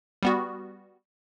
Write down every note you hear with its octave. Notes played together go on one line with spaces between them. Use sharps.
G3 B3 F#4